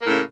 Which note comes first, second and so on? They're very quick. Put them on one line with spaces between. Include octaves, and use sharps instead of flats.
A#3 A2 C#3